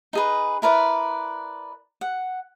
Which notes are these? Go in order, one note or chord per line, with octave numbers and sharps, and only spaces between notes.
D#4 G#4 B4
E4 A#4 B4 D5
F#5